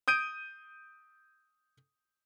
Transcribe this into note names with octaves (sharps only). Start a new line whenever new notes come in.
D#6 G6 D7 D#7